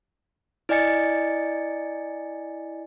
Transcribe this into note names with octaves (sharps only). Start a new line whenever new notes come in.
E4 D5 D#5 G#5 A6 C#7